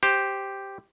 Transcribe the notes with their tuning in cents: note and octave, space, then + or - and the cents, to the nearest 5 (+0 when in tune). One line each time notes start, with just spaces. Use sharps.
G4 +0 C5 +0